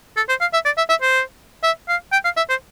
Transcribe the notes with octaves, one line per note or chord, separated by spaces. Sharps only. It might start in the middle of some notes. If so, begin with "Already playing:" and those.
A4
C5
F5
E5
D5
E5
E5
C5
E5
F5
G5
F5
E5
C5